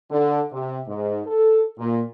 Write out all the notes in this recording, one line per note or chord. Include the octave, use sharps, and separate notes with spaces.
D3
C3
G#2
A4
A#2